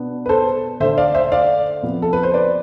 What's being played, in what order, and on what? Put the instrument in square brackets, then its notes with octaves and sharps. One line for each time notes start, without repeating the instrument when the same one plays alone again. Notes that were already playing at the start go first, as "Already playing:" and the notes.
Already playing: [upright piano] B2 B3 D4
B4
A4 C5
D3 A3 D4 C5 E5
D5 F5
C5 E5
D5 F5
C3 F3 B3
A4
B4
C5
B4 D5